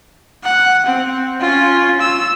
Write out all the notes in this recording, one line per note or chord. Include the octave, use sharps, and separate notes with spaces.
F#5
C4
C#4 F4
E6